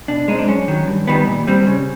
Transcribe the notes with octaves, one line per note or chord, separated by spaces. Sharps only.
B2 D4
G#3 C4 D#4
D4
F#2 C#4
D#3 F#3
G2
D#3 G3 B3
A#2
G3 C4
C#3